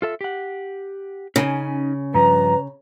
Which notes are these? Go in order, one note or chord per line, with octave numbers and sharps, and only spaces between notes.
F4 A4 E5
G4 F#5
C#3 C#4 D#4 G#5
G2 F3 B4 A#5